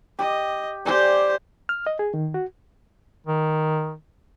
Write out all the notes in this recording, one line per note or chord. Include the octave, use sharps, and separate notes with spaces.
G4 D#5
G4 C5 D5 G#5
F6
D#5
G#4
D#3
F#4
D#3